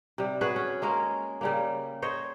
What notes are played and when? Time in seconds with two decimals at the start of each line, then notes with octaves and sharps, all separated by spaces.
0.18 C3 G3
0.41 F#4 G#4 B4 C#5
0.56 C#4
0.82 G#3 A#3 C#4 A#4
1.41 C#3 G3 A#3
2.02 C5 C#5 D#5